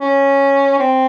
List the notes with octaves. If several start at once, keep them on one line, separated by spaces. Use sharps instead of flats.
C#4
C4